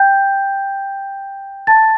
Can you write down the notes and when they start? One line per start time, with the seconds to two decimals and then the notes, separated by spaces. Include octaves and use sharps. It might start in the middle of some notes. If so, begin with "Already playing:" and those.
Already playing: G5 G6
1.67 A5 A6